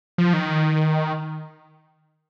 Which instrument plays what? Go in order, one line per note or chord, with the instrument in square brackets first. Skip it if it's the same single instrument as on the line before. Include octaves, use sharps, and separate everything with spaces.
[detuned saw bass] F3
D#3